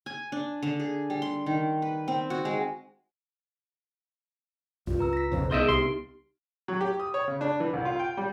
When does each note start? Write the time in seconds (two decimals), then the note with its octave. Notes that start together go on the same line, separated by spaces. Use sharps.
0.06 G#5
0.32 D4
0.63 D3
0.80 G#4
1.10 G3
1.22 C6
1.46 D#3
1.82 B4
2.08 C4
2.30 F#4
2.45 G#3
4.87 C2 G2 F4
4.99 C#2 B4 A#5 E6
5.13 A#6 B6
5.32 B1 F2 C#3 C5
5.51 C2 B3 D#4 G#4 C5 D#5 E5 D7
5.68 C2 G4 C6
6.68 F#3
6.81 G4
7.00 D#6
7.14 C#5
7.28 C#3
7.41 D4
7.60 E3
7.73 C2
7.85 F4
7.99 G5
8.17 G3